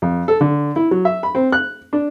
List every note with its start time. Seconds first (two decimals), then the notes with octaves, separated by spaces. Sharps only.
0.02 F2
0.28 A4
0.41 D3
0.76 E4
0.91 F#3
1.05 E5
1.23 B5
1.35 C4
1.52 F#6
1.93 D4